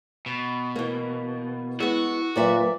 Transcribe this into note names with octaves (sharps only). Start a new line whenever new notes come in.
B2
E3 A#3
G#3 B3 E4 F#4
D2 A#2 F#3 B4 D5 E5 D6